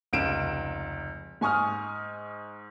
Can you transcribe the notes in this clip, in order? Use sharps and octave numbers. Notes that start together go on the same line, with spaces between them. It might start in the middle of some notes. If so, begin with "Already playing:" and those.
F1 C#2 D7 E7
G#2 G#5 C#6 D#6 F6